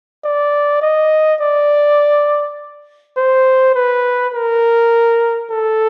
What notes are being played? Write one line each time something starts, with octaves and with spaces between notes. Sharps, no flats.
D5
D#5
D5
C5
B4
A#4
A4